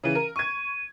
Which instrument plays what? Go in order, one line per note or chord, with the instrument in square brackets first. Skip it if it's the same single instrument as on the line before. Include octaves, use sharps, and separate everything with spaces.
[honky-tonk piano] C#3 E3 [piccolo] D#7
[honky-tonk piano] A#4
[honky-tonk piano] C#6 G#6 [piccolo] D#7